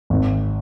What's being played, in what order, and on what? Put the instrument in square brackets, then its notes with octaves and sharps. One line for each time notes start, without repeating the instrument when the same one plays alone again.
[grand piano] G#1